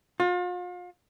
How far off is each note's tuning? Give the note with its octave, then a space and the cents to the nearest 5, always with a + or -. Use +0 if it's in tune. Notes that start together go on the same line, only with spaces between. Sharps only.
F4 +40